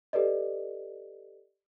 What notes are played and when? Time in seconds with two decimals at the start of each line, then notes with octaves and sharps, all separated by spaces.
0.13 G4 A4 B4 D5 D#5